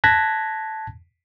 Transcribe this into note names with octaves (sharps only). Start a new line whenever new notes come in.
A5 F#6 G#6 A#6 B6